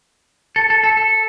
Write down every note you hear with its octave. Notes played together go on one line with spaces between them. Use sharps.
A4
A4
A4
A4